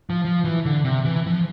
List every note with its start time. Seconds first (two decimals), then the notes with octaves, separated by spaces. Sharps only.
0.10 F3
0.25 F3
0.44 E3
0.65 D3
0.85 C3
1.05 E3
1.26 F3